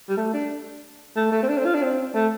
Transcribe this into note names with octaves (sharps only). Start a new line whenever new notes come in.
G3
A3
D4
A3
A3
C4
D4
C4
F4
D4
C4
A3